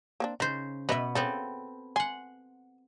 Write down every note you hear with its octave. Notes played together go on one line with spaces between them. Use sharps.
A#3 C4 D4
C#3 D#4 C5
B2 B3 B4 D#5 E5
C#3 B3 C4 A4
F#5 G#5 C6